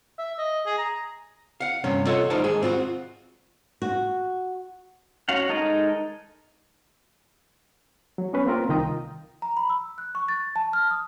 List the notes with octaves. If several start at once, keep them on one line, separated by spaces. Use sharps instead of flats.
E5
D#5
G#4
A#5
F5 F#5
G2 C3 C#4
F4 A4 C#5 D#5 F#5
D2 G3 D#4 A#4 C5 A5
D#2 G#2 G#4
C4 F4 F#4
F#4
C#4 F#4 F5 F#5
G#3 D#4 A4 A#4 D#5
F#3
B3 C#4 B4
A#3 C4 F4 A#4
C2 D#3 F4 G5 A#5 D#6
A#5
B5
E6
F#6
C#6
A6
A5
F6
D#6